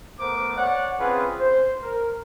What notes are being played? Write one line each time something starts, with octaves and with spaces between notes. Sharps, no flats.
A3 B3 A#4 C5 D6
C#5 D5 F#5
C4 C#4 F4 G#4 B4
C5
A#4